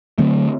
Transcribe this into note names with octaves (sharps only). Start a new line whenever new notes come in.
D3 F#3 A3 C4